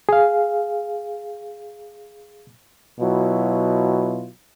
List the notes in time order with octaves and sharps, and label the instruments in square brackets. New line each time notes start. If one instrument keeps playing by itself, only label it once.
[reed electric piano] G#4 F5
[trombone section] B2 F#3 E4 F4